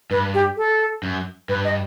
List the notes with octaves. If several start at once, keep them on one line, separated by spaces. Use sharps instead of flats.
G2 B4
G4
A4
F#2
G2 B4
D#5